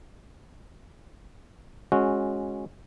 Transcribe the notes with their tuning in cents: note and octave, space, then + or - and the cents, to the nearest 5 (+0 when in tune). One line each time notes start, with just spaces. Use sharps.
G#3 +0 C#4 -15 F#4 -15